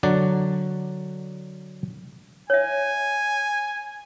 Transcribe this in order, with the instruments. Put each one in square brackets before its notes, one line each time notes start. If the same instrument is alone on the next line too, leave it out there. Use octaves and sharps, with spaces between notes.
[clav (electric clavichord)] D3 F#3 D5 F#5
[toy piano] C#5 E5 [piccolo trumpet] G#5